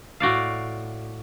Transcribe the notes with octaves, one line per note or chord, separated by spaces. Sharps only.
A2 F#4 D5 F5